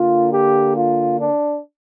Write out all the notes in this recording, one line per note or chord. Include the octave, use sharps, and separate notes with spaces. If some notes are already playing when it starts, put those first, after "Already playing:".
Already playing: D3 A#3 F4
G4
F4
D4